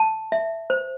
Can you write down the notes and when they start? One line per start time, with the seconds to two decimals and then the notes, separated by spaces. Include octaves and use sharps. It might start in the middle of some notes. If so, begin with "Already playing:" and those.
Already playing: A5
0.32 E5
0.70 C5